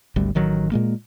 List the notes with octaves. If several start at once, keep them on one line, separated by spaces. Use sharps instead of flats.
G#1 D2 G3
A1 D#3 F#3
A#2 G#3 A#3